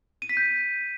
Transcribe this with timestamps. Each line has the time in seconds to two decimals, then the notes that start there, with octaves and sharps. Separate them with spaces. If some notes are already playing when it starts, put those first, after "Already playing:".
0.22 D#7
0.29 B6
0.37 G6